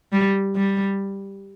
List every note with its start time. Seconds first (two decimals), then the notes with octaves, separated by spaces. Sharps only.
0.13 G3
0.56 G3